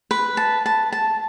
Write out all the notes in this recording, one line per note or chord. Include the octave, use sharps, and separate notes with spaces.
B4
A5
A5
A5